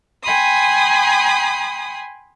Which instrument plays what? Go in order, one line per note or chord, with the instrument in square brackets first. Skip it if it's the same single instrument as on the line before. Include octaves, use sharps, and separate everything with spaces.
[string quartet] G5 G#5 B5 C6 D#6